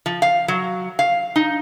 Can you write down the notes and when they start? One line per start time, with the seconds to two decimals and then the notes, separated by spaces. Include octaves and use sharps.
0.06 F3
0.22 F5
0.48 F#3
0.99 F5
1.36 D#4